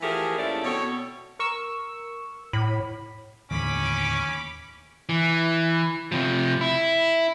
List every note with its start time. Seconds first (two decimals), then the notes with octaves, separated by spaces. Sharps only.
0.01 E3 F3 A3 G4 G#4 A#4
0.37 D#2 F3 A3 C#4 E4 D5
0.64 B2 C4 A4 C#5
1.39 A#4 C#6 E6
2.53 A2 B5
3.51 D#2 A2 D3 C#4 B5 D6
5.09 E3
6.12 C3 F3
6.61 E4